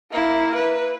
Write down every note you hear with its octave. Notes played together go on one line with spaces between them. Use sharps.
A#3 E4
B4